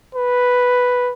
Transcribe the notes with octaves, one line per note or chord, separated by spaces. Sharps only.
B4